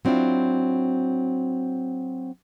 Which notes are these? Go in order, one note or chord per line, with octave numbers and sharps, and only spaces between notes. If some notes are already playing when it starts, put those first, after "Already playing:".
F#3 C4 D4 E4 F4